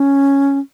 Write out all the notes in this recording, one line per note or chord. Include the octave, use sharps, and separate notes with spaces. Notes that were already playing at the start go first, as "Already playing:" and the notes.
Already playing: C#4